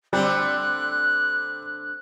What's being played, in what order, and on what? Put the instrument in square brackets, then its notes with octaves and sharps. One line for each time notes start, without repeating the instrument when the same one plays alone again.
[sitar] D3 A3 C4 [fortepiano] G3 [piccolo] F#6